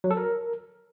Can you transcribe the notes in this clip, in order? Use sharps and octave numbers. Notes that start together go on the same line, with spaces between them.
F#3
A4
A#4